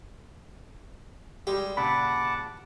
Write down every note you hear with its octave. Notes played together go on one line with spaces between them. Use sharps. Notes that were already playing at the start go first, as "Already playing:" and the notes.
G3 G#3 G4
A#2 C#3 F#5 A5 B5 D6